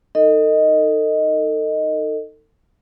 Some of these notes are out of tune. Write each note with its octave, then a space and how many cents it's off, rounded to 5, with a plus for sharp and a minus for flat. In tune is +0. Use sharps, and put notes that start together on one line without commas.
D#4 +0 A4 +40 D#5 +0